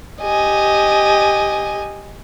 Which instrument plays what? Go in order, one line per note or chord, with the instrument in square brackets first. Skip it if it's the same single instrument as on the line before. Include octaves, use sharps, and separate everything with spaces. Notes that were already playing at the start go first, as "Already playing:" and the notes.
[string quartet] G4 D#5 G#5